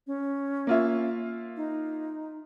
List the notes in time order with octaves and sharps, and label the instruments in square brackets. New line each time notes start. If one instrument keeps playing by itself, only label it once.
[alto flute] C#4
[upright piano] A#3 F4 E5
[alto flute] D#4